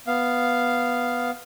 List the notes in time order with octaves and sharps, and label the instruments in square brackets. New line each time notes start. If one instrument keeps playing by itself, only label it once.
[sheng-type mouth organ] B3 F5